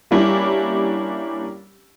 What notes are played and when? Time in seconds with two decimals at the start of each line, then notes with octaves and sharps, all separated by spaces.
0.11 G3 A#3 C#4 D4 E4 G4